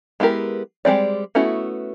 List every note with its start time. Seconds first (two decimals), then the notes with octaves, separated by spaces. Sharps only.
0.20 G#3 B3 E4 G4 A#4
0.85 G3 G#3 C4 D5
1.35 A3 B3 C#4 E4 F#4